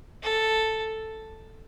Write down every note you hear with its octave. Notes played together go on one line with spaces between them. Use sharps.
A4